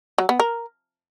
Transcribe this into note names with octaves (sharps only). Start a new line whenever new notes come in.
F#3
B3
A#4